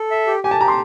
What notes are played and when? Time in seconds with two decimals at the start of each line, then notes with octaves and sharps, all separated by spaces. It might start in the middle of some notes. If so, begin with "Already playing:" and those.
Already playing: A4
0.11 E5
0.27 G4
0.44 G4 G#5
0.51 A5
0.61 G4 A#5
0.68 C6